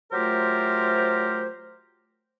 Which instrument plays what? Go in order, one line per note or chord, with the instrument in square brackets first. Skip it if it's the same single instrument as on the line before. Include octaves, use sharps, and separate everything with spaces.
[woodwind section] F#3 A3 F4 G4 A#4 C5